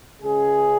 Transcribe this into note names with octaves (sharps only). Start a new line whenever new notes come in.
C#2 C#3 G#3 G#4